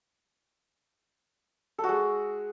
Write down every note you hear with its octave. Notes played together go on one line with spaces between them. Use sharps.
A4
F#4
G#3